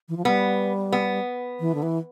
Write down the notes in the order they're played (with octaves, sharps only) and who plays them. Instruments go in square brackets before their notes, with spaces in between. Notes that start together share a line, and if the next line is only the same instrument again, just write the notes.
[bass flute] E3
F3
[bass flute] G3 [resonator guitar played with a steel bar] B3
[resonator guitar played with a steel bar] B3
[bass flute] E3
D3
E3